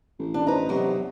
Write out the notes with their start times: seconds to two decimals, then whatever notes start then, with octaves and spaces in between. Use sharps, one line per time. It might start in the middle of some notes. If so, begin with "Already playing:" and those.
0.19 A1
0.34 D4
0.47 D#4 B4 C5 A#5
0.69 E2 C3 F#3